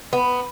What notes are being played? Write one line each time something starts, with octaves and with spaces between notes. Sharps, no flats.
B3